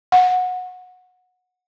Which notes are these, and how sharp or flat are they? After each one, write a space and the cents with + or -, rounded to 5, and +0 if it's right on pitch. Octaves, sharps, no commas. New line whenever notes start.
F#5 -20